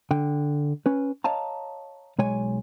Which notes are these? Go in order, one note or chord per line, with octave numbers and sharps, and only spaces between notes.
D3 G5
C#4 B4
C#5 D#5 F5 A5 A#5
B1 G#3 C#5 G#5